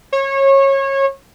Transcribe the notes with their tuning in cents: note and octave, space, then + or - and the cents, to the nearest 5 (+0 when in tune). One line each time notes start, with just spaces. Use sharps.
C#5 -25